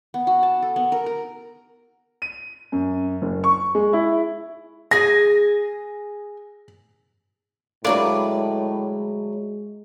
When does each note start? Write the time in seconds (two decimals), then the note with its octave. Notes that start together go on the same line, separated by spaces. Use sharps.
0.14 B3
0.27 F#4
0.43 A5
0.62 A4
0.76 B3
0.92 A#4
1.06 A#4
2.22 D#7
2.72 F#2
3.22 F#1
3.44 C#6
3.75 G#3
3.93 E4
4.91 G#4 G#5 A#6
7.85 D2 A2 F#3 G#3 A#3 D4 B4 D5